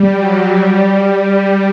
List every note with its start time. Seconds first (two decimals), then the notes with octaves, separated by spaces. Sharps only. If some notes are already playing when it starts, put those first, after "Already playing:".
Already playing: G3
0.16 F#3
0.55 G3
0.92 G3
1.30 G3